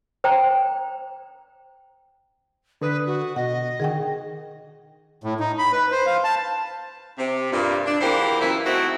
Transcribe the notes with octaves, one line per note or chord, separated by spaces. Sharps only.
C5 G5 A#5
D3 B4 D#6
F#4
B2 D#5 F#5
D3 D#3 G#4 F#5 G5
A2
D#4
B5
B4
C5
F5
A5
C3
G2 A#2
D4
E2 E3 A#3 G4 C5
F#2 A#2 E3 A#3 E4
G#2 A3 C4 D#4 E4 F#4